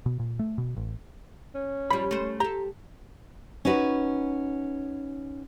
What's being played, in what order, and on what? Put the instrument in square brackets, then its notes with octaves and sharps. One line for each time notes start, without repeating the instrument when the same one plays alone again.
[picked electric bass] B2
A#2
A3
B2
A1
[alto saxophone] C#4
[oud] F3 G3 [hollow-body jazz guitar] B5
[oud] A3 C5
[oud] G4 A4 [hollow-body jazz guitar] A#5
[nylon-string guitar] C#4 D#4 F#4 B4